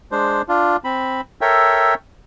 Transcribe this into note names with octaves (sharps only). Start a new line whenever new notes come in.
G#3 D4 C5
D4 F4
C4 B5
A4 A#4 C#5 E5 G5